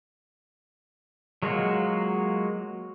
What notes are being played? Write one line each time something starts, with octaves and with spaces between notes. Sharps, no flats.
F#3 G#3 A#3 F4 F#4